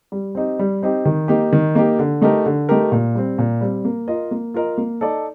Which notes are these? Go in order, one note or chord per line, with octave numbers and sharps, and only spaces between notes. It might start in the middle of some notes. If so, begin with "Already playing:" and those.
G3
C4 D#4 G4
G3
C4 D#4 G4
D#3
A#3 D#4 G4
D#3
A#3 D#4 G4
D3
A3 D#4 G4 A#4
D3
A3 D#4 G4 A#4
A#2
G3 C4
A#2
G3 C4
A#3
F4 A#4 D#5
A#3
F4 A#4 D#5
A#3
D#4 A4 D5